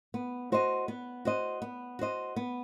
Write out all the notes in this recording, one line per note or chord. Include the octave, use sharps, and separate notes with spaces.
B3
F#4 C5 D#5
B3
F#4 C5 D#5
B3
F#4 C5 D#5
B3